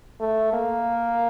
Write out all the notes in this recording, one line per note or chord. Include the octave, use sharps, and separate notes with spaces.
A3
A#3